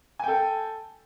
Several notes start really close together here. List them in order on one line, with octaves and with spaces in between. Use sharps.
G#5 G5 A4